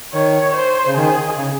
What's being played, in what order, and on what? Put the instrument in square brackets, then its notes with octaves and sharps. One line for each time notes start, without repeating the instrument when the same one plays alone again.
[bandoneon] D#3 [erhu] C#5
[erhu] C5
[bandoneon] C#3
[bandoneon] D#3 [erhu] G#4
[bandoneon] C#3